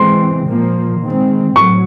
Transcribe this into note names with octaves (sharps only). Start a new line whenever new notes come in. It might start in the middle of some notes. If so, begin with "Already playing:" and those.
Already playing: E3 G#3 C4 C6
A#2 F3 A#3
D#3 G#3 C4
A2 F#3 C#6